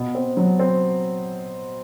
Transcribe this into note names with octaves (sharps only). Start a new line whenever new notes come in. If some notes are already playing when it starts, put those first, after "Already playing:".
Already playing: B2
C4
F#3
C4